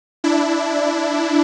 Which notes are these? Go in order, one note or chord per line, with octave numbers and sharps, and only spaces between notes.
D4 E4